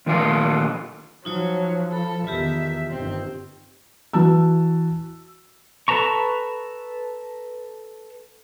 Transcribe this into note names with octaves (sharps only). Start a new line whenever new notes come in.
A#2 D#3 A3 F4 F5 G#5
F3 F#3 D#4 F4 C#5
A4 B5
E2 D#3 F4 G4 E5
G1 G2 D#3 C4
E3 F#4 A5 E6
A4 B4 A5 A#5 C#6